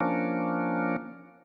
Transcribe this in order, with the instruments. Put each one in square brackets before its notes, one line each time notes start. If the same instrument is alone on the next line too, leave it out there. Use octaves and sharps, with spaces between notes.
[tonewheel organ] F3 A#3 C#4 D4